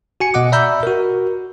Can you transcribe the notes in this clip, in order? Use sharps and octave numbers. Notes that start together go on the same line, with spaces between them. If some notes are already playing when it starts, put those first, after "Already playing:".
F#4 G#5 C#7
B2 D#5 F#5 D6
D5 E5 A#5 B5 E6 G6
F#4 A#4